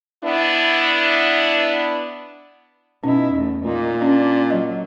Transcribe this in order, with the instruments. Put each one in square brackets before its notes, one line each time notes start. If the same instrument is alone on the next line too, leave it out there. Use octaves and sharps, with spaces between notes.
[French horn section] B3 D4 E4
[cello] B2 E4 [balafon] C#4 [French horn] D#4
[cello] E2 A3
[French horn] A#2 [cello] A#3 D#4
[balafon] C#4 [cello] D4
[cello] F#3 [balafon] D#5